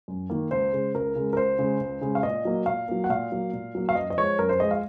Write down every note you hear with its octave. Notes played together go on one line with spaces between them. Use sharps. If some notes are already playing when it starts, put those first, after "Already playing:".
F#2
D#3 A#3
C#2 C5
C#3 G#3
C#2 A#4
C#3 G#3
A#4
C#2 C5
C#3 G#3
C#2
C#3 G#3
F5
A#2 D#5
F#3 A#3
A#2 F5
F#3 A#3
F#5
A#2 F5
F#3 A#3
A#2
F#3 A#3
F5
F#2 D#5
D#5
F3 G#3 C#5
F#2 A#4
C5
F3 G#3 D#5
F5